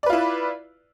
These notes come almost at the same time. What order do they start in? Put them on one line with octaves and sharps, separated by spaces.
D5 B4 F4 E4